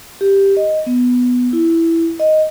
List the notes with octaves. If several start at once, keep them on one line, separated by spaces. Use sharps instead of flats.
G4
D#5
B3
E4
D#5